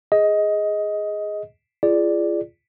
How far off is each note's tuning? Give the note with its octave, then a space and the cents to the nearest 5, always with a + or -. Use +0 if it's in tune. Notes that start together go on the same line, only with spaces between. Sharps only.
G#4 +0 D#5 +15
F4 -35 G#4 +0 D5 +0